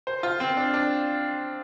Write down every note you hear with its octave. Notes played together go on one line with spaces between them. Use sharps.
C5
F4
C4
D4
D4